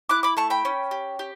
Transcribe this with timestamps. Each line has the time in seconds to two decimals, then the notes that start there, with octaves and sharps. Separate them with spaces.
0.09 E4 D6 F#6
0.23 B5 D6
0.37 A3 A5 C#6
0.50 G5 B5
0.65 C#4
0.91 G4
1.19 G4